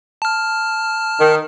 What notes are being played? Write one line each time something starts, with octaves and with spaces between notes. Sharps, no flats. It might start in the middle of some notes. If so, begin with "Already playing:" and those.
A5 F6
D#3